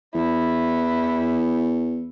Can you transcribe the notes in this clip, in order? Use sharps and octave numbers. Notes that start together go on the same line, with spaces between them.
E2 E4